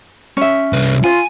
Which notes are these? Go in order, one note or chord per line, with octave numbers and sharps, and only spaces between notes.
C#4 E5
C2 B4
F4 G#5